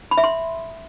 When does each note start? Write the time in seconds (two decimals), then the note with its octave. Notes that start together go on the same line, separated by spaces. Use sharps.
0.11 B5
0.18 E5
0.24 C6